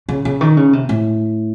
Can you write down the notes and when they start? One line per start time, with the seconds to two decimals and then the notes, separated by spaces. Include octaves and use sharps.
0.09 C#3
0.25 C#3
0.41 D#3
0.57 C#3
0.73 C3
0.89 A2